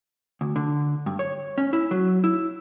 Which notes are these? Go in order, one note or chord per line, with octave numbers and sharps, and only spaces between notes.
D2
D3
G2
C#5
C#4
E4
F#3
E4